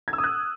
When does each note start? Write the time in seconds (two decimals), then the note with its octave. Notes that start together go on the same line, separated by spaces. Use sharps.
0.08 G#6
0.13 E6
0.18 D#6
0.24 F#6